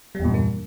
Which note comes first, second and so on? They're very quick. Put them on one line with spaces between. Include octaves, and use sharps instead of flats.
G3 E2 A#2 G2 A#3